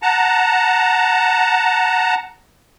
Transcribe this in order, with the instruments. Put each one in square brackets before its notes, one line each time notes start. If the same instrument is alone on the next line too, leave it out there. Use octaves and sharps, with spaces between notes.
[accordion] F#5 A5 A#5